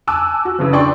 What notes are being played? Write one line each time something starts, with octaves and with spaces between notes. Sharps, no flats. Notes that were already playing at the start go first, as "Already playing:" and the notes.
G#5 A5 D6 E6 F#6
F#4
C#3 E3 F3
D4 D5 G5 C6 C#6